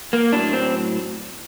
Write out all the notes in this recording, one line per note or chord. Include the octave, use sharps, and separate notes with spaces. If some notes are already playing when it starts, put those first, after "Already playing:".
A#3
A2 F#3 D4
C4